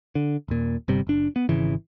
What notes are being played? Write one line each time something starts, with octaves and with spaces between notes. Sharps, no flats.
D3
D#1 A#2
G1 C3 G3
F#1 D4
B3
G#1 C#3 E3